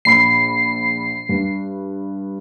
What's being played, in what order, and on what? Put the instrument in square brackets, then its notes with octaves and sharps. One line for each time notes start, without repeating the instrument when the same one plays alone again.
[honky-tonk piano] A#1 B5 C#7 [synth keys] C7
[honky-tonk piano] G2